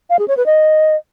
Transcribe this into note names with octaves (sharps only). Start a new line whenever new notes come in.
F5
G#4
C#5
B4
D#5